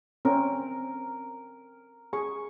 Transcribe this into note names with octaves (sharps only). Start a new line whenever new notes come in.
C4 C#4 A#4
G#4 C#6